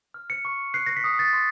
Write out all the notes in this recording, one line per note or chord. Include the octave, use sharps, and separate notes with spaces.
F6
C#7
C#6
F#6 C7
A#6
B6
D#6
A6
C6